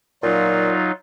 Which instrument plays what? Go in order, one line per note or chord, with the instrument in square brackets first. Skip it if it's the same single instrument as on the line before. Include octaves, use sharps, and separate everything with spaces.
[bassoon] A#2 [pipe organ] F#3 D#4 F4